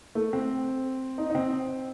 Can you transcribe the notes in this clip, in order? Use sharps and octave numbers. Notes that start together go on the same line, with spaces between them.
A3
C4
D#4
D#4
C4